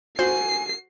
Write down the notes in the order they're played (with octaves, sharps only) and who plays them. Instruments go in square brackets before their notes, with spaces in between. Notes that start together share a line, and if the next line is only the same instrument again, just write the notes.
[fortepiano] F#4 [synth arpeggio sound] C5 [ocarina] G#5 [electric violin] C7